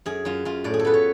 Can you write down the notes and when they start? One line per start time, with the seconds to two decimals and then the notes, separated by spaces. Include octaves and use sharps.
0.06 F#2 G#4
0.25 F#2 F4
0.45 F#2 F4
0.64 A2 D5
0.74 G#4
0.79 A4
0.85 B3 B4
0.94 C#5